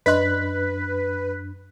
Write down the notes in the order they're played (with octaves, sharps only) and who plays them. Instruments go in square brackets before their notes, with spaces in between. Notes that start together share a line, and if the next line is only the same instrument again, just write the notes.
[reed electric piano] F#2 D4 [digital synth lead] B4 [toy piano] D5 D#5 C6 [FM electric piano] F#6 B6